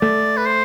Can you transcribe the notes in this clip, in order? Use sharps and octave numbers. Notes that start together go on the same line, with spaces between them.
A3 D5
B4
C5